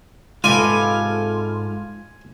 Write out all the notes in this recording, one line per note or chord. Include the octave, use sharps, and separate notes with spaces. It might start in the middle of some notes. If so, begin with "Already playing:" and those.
G#2 C3 G#3 F4 A4 B4 G5 G#5